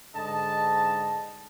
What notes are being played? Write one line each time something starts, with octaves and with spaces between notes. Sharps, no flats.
G#2 D3 D#5 A5